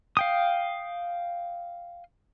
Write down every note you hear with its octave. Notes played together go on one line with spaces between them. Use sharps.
F5 G5 D#6